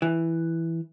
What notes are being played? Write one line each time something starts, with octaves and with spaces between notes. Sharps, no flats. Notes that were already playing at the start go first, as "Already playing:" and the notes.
E3